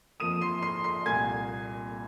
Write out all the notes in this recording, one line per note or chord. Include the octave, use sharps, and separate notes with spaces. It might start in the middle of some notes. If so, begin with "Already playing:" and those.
F2 F3 A#3 D#6 D#7
C6 C7
C6 C7
C6 C7
C2 A#2 A#3 G#5 G#6